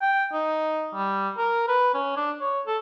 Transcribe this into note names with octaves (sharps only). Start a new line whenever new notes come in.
G5
D#4
G3
A#4
B4
C#4
D4
C#5
A4